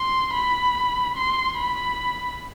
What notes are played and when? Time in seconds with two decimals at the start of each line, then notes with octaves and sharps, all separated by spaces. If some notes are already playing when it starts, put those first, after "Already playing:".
Already playing: C6
0.34 B5
1.17 C6
1.58 B5